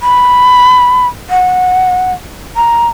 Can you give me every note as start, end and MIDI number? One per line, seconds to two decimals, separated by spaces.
0.01 1.07 83
1.30 2.13 78
2.56 2.88 82